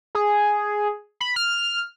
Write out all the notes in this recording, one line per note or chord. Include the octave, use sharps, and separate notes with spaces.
G#4
B5
F6